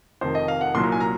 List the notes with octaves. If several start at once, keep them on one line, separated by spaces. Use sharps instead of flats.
F1 F2 D#3 C5
D#5
F5
F#5
C2 A#2 F#3 C6
A#5
G#5
A#5